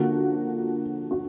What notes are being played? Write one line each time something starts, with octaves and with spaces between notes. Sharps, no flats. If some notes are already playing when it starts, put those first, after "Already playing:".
Already playing: D3 F3 A#3 F#4
F#4